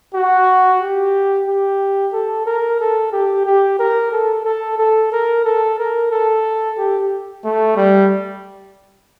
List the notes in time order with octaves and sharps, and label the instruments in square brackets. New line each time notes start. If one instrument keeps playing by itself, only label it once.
[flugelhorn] F#4
G4
G4
A4
A#4
A4
G4
G4
A#4
A4
A4
A4
A#4
A4
A#4
A4
G4
A3
G3